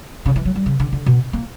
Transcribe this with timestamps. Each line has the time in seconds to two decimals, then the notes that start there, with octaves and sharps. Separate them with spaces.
0.26 C#3
0.36 E3
0.45 F#3
0.56 G3
0.66 C#3
0.80 D3
0.92 D3
1.06 B2
1.33 A#3